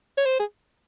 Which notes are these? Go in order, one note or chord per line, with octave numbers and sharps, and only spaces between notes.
C#5
C5
G#4